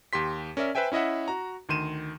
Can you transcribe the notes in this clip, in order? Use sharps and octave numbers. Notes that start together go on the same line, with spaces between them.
D#2 G4 C6 B6
C#4 A#4 D5 E5
B4 C5 E5 G5 G#5
C#4 E4 D#5 E5 F#5
F#4 A#5
D2 D#3 C6 D#7 E7